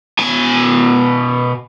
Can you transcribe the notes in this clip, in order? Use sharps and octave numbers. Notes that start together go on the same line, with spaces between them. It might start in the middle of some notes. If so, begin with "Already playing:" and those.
B2 G#5